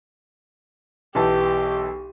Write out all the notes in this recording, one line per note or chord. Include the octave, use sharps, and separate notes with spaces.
B1 E3 G4 A5